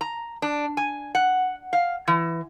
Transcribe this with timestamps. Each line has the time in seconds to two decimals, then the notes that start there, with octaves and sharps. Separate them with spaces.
0.01 A#5
0.42 D4
0.77 G#5
1.15 F#5
1.73 F5
2.08 E3